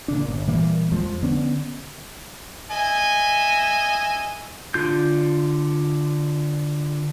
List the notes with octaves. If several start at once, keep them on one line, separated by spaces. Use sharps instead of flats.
A#2 C#3 D4
G1
A#2 E3 G3 A#3
F2 F3 G#3
D3 B3 C#4 D4
D#5 E5 G#5
D3 F4 G6